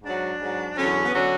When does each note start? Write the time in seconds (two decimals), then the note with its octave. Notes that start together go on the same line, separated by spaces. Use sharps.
0.02 G#2 F#3 D4
0.39 G#2 F#3
0.77 E2 D3 F#3 C#4
1.05 B3
1.14 D3 F#3 C#4